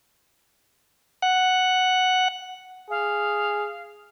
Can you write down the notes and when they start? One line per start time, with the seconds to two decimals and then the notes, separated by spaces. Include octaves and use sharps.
1.23 F#5
2.90 G#4 F5